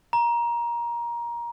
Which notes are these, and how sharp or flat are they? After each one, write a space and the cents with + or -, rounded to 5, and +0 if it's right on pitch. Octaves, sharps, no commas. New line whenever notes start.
A#5 +20